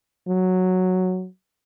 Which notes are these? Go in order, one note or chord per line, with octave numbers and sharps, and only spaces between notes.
F#3